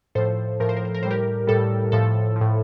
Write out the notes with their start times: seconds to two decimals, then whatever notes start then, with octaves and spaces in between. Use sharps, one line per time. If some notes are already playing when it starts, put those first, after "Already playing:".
0.15 A2 F3 A4 C5
0.60 A2 F3 A#4
0.69 C5
0.77 A#4
0.85 C5
0.94 A#4
1.03 A2 G3 C5
1.11 G4 A#4
1.47 A2 G3 A4
1.92 A2 F3 A4
2.36 F3
2.41 A2